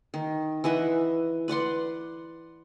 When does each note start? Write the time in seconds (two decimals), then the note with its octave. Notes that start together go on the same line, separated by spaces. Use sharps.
0.14 D#3
0.64 E3 D#5 E5 F#5
1.48 B4 D5 F#5 C6